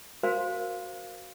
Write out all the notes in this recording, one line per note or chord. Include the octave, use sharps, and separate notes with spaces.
F#4 A#4 C5 F5 G#5 C6